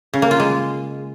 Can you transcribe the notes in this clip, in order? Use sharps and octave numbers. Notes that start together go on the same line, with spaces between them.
C#3
A#3
F4
G#3